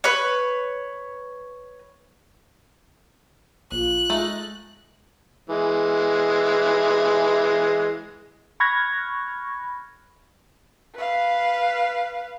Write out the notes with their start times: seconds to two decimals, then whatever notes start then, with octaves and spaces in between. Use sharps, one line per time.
0.04 B4 C#5
3.72 A#1 F4 F#6
4.10 G#3 A3 D#4
5.49 E3 G#3
8.60 B5 C#6 F6 F#6 G#6 A#6
10.96 B4 F5